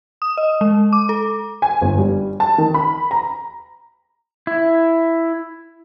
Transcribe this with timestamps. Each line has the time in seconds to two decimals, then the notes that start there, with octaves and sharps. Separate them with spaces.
0.22 D#6
0.37 D#5
0.61 G#3
0.93 D6
1.09 A4
1.62 G#5
1.81 G1
1.98 G3
2.40 A5
2.58 D#3
2.74 B5
3.11 A#5
4.47 E4